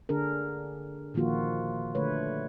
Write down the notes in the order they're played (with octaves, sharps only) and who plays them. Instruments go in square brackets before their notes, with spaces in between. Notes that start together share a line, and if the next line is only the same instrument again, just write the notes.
[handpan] D3 D4 G#4 A#4
A#2 D#3 F3 A#3 F4 F#4
D3 A3 B4 C#5